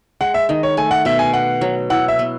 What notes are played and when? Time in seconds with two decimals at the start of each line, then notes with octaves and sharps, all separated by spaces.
0.21 G#3 F#5
0.34 E5
0.49 D#3 D#5
0.63 C#5
0.77 A3 G#5
0.91 F#5
1.05 B2 E5
1.19 G#5
1.33 B3 F#5
1.61 F#3
1.90 E4 F#5
2.08 E5
2.19 B3